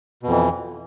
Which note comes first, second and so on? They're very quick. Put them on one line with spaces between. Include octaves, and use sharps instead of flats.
B2 F2 E3